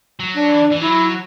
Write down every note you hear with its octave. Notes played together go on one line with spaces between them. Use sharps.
F#3
D4
E3
E3
F#3 E4